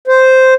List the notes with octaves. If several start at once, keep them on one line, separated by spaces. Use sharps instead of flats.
C5